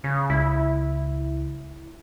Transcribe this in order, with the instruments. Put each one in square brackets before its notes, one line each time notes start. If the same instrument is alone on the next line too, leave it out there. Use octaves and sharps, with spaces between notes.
[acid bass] C#3
[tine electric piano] C#2 [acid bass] E4